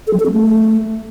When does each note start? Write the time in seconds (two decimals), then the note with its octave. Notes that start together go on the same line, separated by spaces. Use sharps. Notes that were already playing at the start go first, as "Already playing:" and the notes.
0.07 A4
0.13 F#3
0.19 A4
0.26 C4
0.32 A3